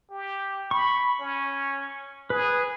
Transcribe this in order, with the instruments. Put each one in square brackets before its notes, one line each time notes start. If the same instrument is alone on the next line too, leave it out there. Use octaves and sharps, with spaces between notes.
[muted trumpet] G4
[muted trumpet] B5 [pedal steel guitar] C#6
[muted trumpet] C#4
[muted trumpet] G#4 [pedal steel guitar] B4